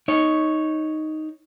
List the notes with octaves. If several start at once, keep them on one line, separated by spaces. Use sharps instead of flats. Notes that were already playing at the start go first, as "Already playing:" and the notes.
D#4 C#5